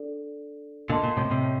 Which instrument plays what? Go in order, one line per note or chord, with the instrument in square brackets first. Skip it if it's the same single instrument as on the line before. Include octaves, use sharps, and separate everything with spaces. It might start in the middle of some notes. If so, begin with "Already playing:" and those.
Already playing: [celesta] D4 A4 D5
[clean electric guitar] A#2 D3 [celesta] A#4 D#5 A5 C6
[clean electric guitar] A#2
A2 C3
A2 C3